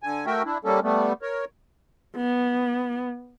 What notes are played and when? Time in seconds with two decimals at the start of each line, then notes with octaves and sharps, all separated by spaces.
0.03 D3 G#5
0.26 A3 F#4 A#4 E5 G5
0.45 D4 E4
0.64 G3 A#3 C#4 A4
0.83 G3 A3 B3
1.22 A#4 C#5
2.16 B3